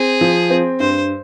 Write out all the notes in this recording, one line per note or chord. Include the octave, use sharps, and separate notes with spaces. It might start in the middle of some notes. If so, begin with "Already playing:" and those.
Already playing: C4 G#4
F3
C4
G2 C5